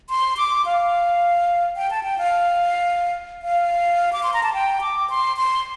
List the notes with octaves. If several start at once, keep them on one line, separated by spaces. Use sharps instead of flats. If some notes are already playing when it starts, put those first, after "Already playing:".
C6
D6
F5
G5
A5
G5
F5
F5
D6
C6
A#5
A5
G5
D6
C6
C6